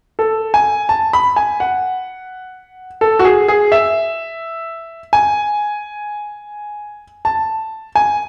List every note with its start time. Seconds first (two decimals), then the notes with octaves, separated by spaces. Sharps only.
0.19 A4
0.54 G#5
0.89 A5
1.13 B5
1.36 G#5
1.60 F#5
3.01 A4
3.19 F#4
3.25 G#4
3.48 G#4
3.72 E5
5.13 G#5
7.25 A5
7.95 G#5